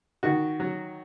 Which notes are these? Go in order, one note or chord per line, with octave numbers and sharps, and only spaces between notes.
D#3 F#4
F#3